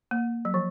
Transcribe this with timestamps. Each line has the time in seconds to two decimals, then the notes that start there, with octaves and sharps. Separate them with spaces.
0.11 A#3
0.45 F#3
0.54 F3